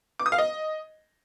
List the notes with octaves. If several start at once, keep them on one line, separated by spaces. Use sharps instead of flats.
D6
D#6
F5
D#5